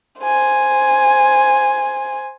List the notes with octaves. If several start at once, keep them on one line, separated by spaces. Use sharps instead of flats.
C5 G#5